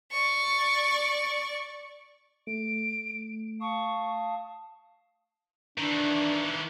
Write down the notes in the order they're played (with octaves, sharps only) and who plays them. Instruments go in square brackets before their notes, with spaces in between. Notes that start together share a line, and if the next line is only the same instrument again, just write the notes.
[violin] D5 C#6
[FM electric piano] A3 [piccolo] D7
[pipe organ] F5 A5 D#6 [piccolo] C#6
[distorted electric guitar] D#3 E3 [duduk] D4